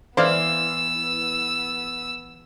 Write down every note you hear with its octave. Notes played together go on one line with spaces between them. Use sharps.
E3 B3 E4 C5 D5 F5 E6